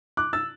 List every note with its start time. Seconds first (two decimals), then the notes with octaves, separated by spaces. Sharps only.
0.17 D6 F#6
0.33 E6 A6